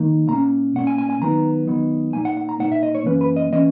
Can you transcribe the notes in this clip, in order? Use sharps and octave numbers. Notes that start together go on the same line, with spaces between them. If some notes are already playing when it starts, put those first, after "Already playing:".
Already playing: D#3 A#3 D#4
A#2 A#3 C#4 A#5
A#2 A#3 C#4 F#5
G#5
G#5
G#5
D#3 F#3 B3 D#4 A#5
D#3 F#3 B3 D#4
A#2 A#3 D#4 G#5
F#5
F#5
A#5
A#2 A#3 D#4 F#5
E5
D#5
C#5
F#2 E3 A#3 C#4 B4
B4
D#5
E3 A#3 C#4 D#5